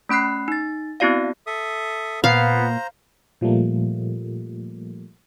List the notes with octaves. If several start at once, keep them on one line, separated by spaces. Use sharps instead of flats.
A3 C#4 B5 F#6 C7
D#4 A6
B3 C4 E4 F#4 D5 F5
A4 E5 D#6
A#2 B3 C5 F5 A#5
A#2 F3 G3 A3 A#3